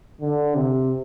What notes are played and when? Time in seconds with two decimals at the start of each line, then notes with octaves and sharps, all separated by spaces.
0.21 D3
0.55 C3